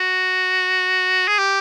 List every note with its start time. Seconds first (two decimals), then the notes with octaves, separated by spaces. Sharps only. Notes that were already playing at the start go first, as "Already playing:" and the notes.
Already playing: F#4
1.28 G#4
1.38 G4